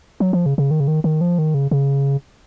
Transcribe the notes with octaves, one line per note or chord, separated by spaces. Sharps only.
F#3
F3
C#3
C#3
D#3
C#3
D#3
D#3
F3
D#3
C#3
C#3